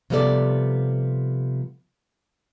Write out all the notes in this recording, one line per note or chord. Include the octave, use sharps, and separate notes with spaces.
C3 F3 G3 B3 A4 D5